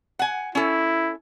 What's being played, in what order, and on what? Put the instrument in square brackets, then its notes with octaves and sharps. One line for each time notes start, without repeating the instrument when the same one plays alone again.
[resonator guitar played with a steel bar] F#5 G#5
[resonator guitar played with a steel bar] C#4 A4 [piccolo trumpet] E4